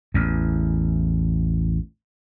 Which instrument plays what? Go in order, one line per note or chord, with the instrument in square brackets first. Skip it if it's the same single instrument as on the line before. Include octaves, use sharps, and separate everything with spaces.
[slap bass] A1 E2